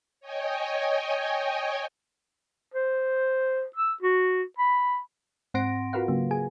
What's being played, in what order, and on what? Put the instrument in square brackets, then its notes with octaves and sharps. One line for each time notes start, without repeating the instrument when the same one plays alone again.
[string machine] C#5 D#5 G5 G#5
[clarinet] C5
E6
F#4
B5
[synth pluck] G#2 C4 F#5 C6 A#6 D7
F4 F#4 A#4 B4 F5 F#5
C#3 F#3 A#3
G#4 G#5